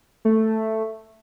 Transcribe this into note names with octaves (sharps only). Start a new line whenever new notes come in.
A3